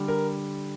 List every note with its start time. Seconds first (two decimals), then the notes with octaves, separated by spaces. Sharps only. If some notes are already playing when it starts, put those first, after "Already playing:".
Already playing: D3 G3
0.08 A#4